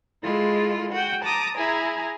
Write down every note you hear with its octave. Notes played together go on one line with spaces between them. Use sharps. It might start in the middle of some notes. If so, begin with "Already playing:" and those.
G#3 E4 F4 A4
F#4 F#5 G5
A5 A#5 D6 D#6
E4 G#4 G#5 A#5